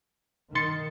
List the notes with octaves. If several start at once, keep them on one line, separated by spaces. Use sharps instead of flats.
D#3 C6 A6 C#7